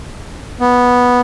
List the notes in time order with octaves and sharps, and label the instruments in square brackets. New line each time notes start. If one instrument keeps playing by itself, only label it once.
[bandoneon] B3